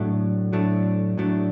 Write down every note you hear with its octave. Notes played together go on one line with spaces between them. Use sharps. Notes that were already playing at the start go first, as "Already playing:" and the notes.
Already playing: A2 F#3 A3 D4
A2 F#3 A3 D4
A2 F#3 A3 D4